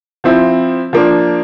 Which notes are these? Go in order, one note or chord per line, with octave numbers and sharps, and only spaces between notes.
F3 C4 E4
F3 A#3 D4